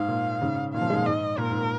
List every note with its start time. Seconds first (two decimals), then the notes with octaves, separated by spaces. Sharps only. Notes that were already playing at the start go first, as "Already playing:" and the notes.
Already playing: G#2 F5
0.09 A#2
0.41 G#2 C#3
0.74 A#2 D#3 F5
0.81 C#3 F3
0.90 D#3 G#3
0.97 A#2
1.06 G#2 D#5
1.38 A#2 A#4
1.50 G#2
1.62 A#2